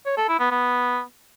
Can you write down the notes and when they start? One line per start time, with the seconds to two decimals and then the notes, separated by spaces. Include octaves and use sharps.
0.06 C#5
0.17 A4
0.29 E4
0.40 B3
0.51 B3